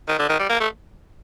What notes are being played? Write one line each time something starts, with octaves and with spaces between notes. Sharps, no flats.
D#3
D3
D#3
G3
A#3
A3